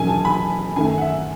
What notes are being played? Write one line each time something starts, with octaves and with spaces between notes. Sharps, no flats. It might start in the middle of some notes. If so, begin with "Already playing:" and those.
Already playing: E1 D#2 C#3 F#3 G#5
A5
B5
F#2 D#3 A3 G#5
F#5
E5